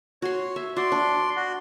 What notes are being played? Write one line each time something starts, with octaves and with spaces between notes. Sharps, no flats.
F#4 C#5 C6
E5
F#4 D5 C6
D4
F#4